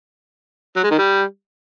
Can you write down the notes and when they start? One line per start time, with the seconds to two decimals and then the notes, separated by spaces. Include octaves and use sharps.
0.76 F#3
0.84 G#3
0.91 D#3
0.98 G3